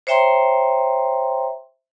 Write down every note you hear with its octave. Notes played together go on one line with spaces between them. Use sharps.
C5 C#5 E5 G5 A#5 C6